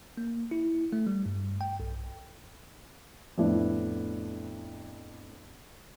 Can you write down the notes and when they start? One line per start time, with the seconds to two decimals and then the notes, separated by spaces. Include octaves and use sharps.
0.17 A#3
0.51 E4
0.93 A3
1.07 G3
1.26 G2
1.61 G5
1.80 B1
3.38 F2 A2 A3 B3 D4 E4